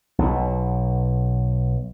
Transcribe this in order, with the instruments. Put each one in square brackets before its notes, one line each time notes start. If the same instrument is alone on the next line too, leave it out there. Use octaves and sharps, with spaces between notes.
[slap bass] B1 B2